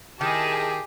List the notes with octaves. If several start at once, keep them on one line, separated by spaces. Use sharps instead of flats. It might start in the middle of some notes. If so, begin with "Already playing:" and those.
D#3 E4 G4 G#4 D#5 A5